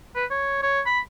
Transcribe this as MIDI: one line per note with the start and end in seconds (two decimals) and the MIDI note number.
0.16 0.25 71
0.31 0.63 73
0.63 0.81 73
0.86 1.00 83